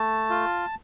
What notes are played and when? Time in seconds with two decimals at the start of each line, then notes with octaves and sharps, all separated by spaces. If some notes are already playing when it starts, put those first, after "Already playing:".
Already playing: A3 A5
0.30 F4